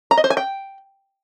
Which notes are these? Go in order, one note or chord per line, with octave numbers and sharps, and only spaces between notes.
A#5
D#5
C5
G#5
G5